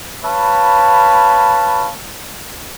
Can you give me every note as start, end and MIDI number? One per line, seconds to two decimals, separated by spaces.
0.25 1.93 71
0.25 1.93 73
0.25 1.93 77
0.25 1.93 81
0.25 1.93 83